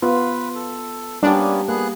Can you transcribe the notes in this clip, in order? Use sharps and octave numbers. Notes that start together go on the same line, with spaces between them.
B3 F4 B4
A4
G3 A#3 B3 C#4 D4 G4
A#3 B3 G#4 F#6